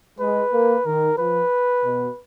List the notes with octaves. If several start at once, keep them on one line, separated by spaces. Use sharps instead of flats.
G#3 B4
A#3
D#3 A#4
F3 B4
B2